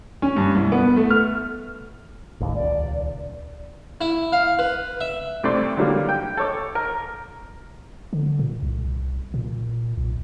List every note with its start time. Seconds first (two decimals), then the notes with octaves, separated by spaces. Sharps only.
0.22 C#4
0.36 G2
0.55 C2
0.72 B3
0.96 A3
1.10 F6
2.40 A1 D#2
2.55 D#1 C#2 D5
4.01 E4
4.32 F5
4.59 B4
5.01 E5
5.43 C2 A3 C4 D5 C6
5.77 D3 F#3 G3 A#3
6.09 G5
6.37 A4 C#5 D6
6.75 A#4
8.13 D3
8.39 A#2
8.62 C2
9.34 A#2
9.97 B1